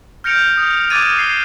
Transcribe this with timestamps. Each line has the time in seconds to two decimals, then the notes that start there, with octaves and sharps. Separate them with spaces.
0.24 F6 G6 A#6 C#7 D7 F7
0.57 D#6
0.90 D6 F6 F#6 G#6 A6 D#7
1.18 C7 G7